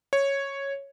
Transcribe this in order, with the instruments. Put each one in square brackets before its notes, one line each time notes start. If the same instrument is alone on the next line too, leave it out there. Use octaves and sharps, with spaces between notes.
[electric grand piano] C#5